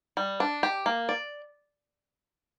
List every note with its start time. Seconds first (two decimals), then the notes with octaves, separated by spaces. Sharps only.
0.17 G3
0.40 D4
0.63 G4
0.86 A#3
1.09 D5